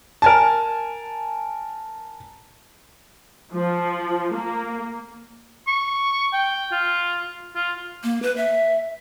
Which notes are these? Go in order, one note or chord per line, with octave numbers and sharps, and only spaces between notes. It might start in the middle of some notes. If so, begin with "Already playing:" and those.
A#4 G#5 A5
F3
A#3
C#6
G5
F4
F4
A#3
B4
E5